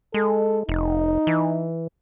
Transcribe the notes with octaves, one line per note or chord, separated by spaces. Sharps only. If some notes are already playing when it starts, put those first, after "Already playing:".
G#3 A4
F1 D#4
E3